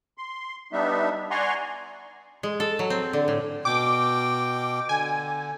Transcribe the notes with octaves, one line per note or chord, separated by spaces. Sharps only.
C6
G3 B3 D4 D#4 E5
D5 F#5 G#5 A#5 C6 C#6
G#3
A4
F#3
C4
D3
A2
B2 G5 D6
D3 G#5